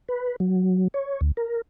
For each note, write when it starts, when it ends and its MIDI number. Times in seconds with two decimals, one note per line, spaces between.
0.09 0.36 71
0.40 0.88 54
0.94 1.21 73
1.21 1.31 38
1.37 1.61 70